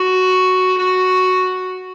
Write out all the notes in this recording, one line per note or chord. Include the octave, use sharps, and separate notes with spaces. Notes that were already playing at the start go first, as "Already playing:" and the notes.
Already playing: F#4
F#4